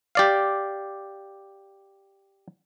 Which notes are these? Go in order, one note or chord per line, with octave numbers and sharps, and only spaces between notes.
G4 D5 F5